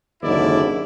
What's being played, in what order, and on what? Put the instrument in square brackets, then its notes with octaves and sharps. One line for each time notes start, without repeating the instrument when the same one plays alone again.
[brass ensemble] F#1 D#2 G#2 D3 E4 D5